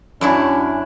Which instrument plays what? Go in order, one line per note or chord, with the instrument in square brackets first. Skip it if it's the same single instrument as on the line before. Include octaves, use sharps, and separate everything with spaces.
[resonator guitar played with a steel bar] F#2 D4 E4 [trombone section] F#3 C#4